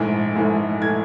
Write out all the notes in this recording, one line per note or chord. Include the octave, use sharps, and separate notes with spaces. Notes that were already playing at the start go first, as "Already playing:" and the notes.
Already playing: A#1 G#2 E3 A3
A#1 G#2 E3 A3
E3 A3 G#6